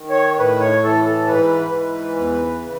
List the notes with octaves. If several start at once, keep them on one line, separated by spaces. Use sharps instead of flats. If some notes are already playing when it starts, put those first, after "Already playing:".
Already playing: D#3
C#5
C#5
A2 B4
C#5
E3 A4
A4
G#2 B4
E3
E2
C#3